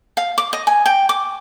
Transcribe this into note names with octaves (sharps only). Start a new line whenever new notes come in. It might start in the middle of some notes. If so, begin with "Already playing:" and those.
F5
D6
D#5
G#5
G5
D6